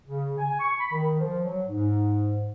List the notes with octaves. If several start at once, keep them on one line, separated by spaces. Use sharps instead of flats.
C#3
G#5
C#6
B5
D#3
F3
F#3
G#2